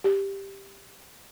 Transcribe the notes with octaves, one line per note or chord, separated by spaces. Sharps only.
G4